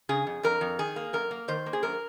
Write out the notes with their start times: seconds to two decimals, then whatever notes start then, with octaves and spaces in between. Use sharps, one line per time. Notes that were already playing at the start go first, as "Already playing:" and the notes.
0.09 C#3 G#4
0.27 F2
0.43 F2 A#4
0.61 F2
0.79 D#3 G#4
0.96 A#3
1.13 F#2 A#4
1.31 A#3
1.48 D#3 C5
1.66 A#3
1.73 G#4
1.83 F#2 A#4